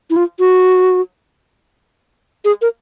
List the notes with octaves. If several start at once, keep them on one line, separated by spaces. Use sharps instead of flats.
E4
F4
F#4
G#4
A#4